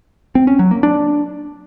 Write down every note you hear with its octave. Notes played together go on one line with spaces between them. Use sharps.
C4
C#4
F#3
A#3
D4